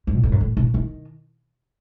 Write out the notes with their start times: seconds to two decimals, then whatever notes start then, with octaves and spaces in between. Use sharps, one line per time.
0.07 E2
0.15 B2
0.23 A2
0.32 F#2
0.41 A2
0.57 B2
0.74 D#3